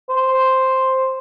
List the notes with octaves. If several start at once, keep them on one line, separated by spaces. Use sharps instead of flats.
C5